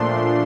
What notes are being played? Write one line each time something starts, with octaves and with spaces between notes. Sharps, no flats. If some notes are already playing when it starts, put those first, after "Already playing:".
Already playing: A#2 F3 A3 D4 C6